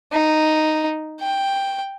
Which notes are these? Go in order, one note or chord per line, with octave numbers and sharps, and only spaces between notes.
D#4
G5